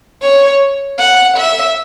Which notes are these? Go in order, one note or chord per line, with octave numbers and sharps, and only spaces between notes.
C#5
F#5
E5